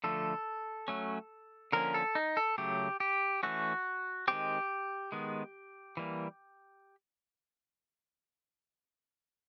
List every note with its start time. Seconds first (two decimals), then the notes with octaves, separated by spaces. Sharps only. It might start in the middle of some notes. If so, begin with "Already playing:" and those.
0.04 D3 F3 A3 A4
0.88 F#3 A3 C#4
1.72 D3 F3 A#3 C#4 A#4
1.94 A4
2.15 D#4
2.37 A4
2.58 C#3 F#3 A3 G4
3.00 G4
3.43 E3 A3 C#4 F#4
4.28 D#3 G#3 C4 G4
5.12 D#3 G#3 B3
5.97 E3 G3 A#3